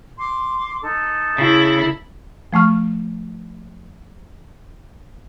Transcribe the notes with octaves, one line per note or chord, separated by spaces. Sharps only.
C6 D6
D#4 A4
C#3 E4
F3 A3 C#6 F6